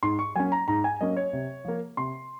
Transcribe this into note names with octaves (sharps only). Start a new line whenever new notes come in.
G#2 C6
C#6
F#3 A#3 C#4 G#5
A#5
G#2 A#5
G#5
F#3 A#3 C#4 D#5
C#5
C3
F3 A#3
C3 C6